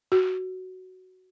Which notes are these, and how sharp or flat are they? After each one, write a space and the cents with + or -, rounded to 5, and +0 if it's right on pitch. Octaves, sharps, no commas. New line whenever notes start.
F#4 +5